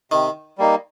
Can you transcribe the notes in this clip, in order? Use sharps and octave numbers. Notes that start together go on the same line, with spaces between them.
C3 D#3
G3 A#3 D#4